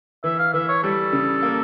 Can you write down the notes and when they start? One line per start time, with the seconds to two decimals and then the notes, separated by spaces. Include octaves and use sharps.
0.24 E3 E5
0.39 F5
0.54 E3 E5
0.69 C#5
0.84 G3 A4
1.13 C#3
1.43 A#3